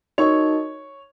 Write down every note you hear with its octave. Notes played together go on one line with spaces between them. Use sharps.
D#4 F#4 A#4 C#5 D#5 C#6